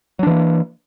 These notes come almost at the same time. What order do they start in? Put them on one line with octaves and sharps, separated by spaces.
F#3 D4 E3 A#3